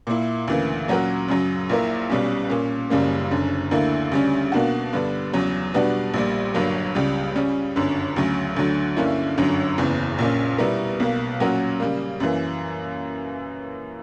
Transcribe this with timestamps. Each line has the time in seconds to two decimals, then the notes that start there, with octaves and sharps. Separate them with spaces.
0.07 A#2 A#3 E4
0.48 D2 C#3 E3 A#3
0.88 A#2 F#3 C#4 F#4 A#4
1.28 F#2 C#3 F#3
1.69 A#1 A#2 A#3 E4 A#4
2.10 B1 B2 G3 C#4
2.50 A#2 A#3 C#4
2.90 F#1 F#2 C#3 G3 A#3
3.31 F#1 F#2 D3
3.71 D2 D3 A#3 E4
4.11 D2 C#3 G3 C#4
4.52 B2 A#3 D4 F#4
4.93 G2 D3 G3 B3 D4
5.33 E2 C#3 F#3
5.74 B2 G3 B3 D4 F#4
6.14 A#1 A#2 G3
6.54 G1 G2 F#3 A#3
6.95 C#2 C#3 G3
7.35 C#3 G3 C#4
7.76 G1 F#2 D3
8.16 D2 C#3 F#3 C#4
8.56 D2 D3 F#3
8.97 G2 D3 A#3 C#4 E4
9.38 G1 F#2 D3 F#3
9.78 F#1 E2 C#3 E3
10.19 A#1 A#2 A#3 C#4
10.58 B2 G3 B3 E4 A#4
11.00 B1 B2 A#3
11.40 A#2 F#3 C#4 F#4 A#4
11.80 C#3 G3 A#3
12.20 F#2 E3 A#3